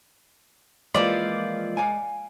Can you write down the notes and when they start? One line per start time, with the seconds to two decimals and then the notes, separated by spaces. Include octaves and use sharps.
0.95 E3 F3 G#3 A#3 D5 D#5
1.77 D5 F5 G#5